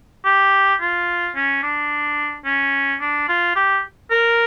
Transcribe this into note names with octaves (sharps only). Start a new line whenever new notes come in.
G4
F4
C#4
D4
C#4
D4
F4
G4
A#4